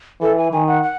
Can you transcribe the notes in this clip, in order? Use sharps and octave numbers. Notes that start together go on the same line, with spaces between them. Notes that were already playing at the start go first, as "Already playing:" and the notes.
E3 A4
G#5
D#3 G#5
F#5
F#5